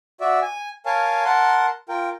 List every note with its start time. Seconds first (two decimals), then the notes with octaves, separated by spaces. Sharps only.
0.20 F#4 D5 E5
0.42 G#5
0.86 A#4 C#5 F5 G#5 A5
1.25 A#4 F#5 A5 C6
1.89 F4 A#4 G5